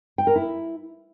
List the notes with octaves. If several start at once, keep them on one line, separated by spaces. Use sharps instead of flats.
G5
A#4
E4